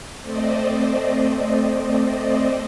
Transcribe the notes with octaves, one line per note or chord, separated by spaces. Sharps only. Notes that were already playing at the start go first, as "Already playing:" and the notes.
A3 C4 C5 D5 D#5